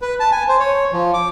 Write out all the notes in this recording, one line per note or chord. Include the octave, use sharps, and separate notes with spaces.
B4
A5
G#5
C5
C#5
F3
D6